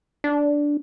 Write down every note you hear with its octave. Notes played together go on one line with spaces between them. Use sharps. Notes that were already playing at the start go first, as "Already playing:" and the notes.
D4